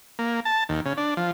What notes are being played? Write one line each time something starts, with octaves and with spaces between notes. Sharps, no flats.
A#3
A5
D#2
C#3
D4
F3